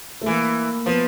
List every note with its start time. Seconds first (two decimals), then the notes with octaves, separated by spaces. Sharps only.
0.22 A3
0.26 E3 A#3
0.86 F3 B3